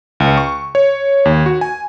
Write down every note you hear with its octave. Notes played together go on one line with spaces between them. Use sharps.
C#2
C#6
C#5
D#2
F#4
G#5